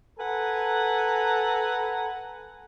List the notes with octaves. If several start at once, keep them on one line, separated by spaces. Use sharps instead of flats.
A4 B4 F#5 G#5 A#5